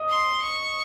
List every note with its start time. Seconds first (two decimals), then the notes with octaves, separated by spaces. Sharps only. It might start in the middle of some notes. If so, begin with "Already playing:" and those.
Already playing: D#5 D#6
0.09 C6
0.42 C#6